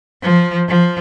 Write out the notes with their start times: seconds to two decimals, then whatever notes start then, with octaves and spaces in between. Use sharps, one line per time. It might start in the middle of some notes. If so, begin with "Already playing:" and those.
0.23 F3
0.69 F3